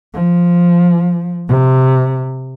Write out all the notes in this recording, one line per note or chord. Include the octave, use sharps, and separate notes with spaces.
F3
C3